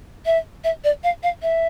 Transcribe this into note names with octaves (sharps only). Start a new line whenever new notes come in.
E5
E5
D5
F5
F5
E5